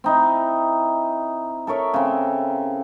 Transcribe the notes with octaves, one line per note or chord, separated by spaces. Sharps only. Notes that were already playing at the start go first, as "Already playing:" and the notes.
C4 D#4 E4
A4 A#4 C#5 E5
C#3 C4